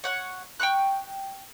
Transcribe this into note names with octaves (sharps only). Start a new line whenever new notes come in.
C#5 F#5 F#6
G5 A#5 C#6 F#6